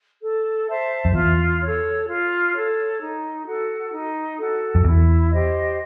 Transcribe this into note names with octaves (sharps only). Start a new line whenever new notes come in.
A4
C5 E5 A5
F2
E2 F4
A4 C#5
F4
A4 C#5
D#4
F#4 A4
D#4
F#4 A4
F2
E2 E4
G4 C5 D#5